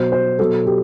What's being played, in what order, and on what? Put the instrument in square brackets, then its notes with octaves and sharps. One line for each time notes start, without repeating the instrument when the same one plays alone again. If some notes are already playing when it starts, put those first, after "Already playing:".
Already playing: [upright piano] B2 F#3 C5
C5
B2 F#3 A4
G4